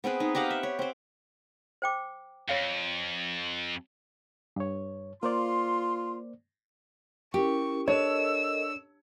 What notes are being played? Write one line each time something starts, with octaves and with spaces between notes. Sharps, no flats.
B3 C4 G#4 B4
D#4
G4 D#5 F5 F#5
E5
C#5
C4 C5
C5 G5 D6
F2 C#5 F5
G2 C#5
A#3 F4 C5 D5 C6
C#4 E4 G4 A#4 C#6
D4 A4 A#4 C#5 D#5 E6